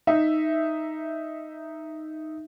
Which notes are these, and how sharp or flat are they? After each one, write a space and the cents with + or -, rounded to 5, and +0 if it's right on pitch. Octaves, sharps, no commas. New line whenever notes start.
D#4 +0 E5 +0